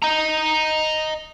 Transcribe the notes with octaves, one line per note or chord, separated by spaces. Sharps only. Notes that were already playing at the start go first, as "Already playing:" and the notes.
D#5 A#5